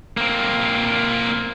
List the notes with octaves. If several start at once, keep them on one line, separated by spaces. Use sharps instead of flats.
A#3 C4